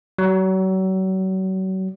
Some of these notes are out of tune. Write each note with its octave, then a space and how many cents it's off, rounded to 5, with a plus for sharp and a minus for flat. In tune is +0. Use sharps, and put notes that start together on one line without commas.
F#3 +35